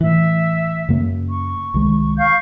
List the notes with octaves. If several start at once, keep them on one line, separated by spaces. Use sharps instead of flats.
A2 E3 E5
F#2 C#3 A#3
C#6
C2 D#3 G#3
F5 C#6 G6